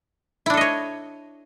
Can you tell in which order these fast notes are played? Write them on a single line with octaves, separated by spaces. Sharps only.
E4 D4 A4 D#5 C#5